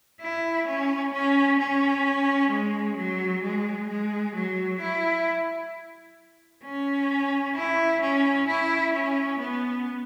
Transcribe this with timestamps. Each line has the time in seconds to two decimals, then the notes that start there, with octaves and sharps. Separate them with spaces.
0.21 E4
0.67 C#4
1.13 C#4
1.59 C#4
2.51 G#3
2.97 F#3
3.43 G#3
3.88 G#3
4.35 F#3
4.80 E4
6.64 C#4
7.55 E4
8.01 C#4
8.48 E4
8.93 C#4
9.39 B3